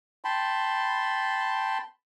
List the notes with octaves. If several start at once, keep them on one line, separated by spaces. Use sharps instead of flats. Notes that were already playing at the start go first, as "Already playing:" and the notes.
G5 A5 B5 C6